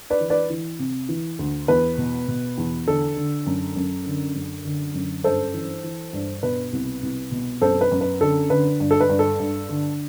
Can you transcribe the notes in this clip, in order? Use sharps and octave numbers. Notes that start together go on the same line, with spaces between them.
B4 D5
E3
B4 D5
E3
C3
E3
D2
E2 B4
B2
B2
E2
D3 A4
D3
F#2
F#2
D3
F#2
D3
F#2
G2 A4 C5
E3
E3
G2
B2 B4
C2
C2
B2
F#2 A4 C5
B4
F#2
B4
D3 A4
D3 B4
G2
A4
B4
G2
A4
G2
D3